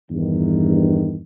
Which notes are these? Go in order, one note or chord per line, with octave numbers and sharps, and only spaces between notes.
E2 G2 D#3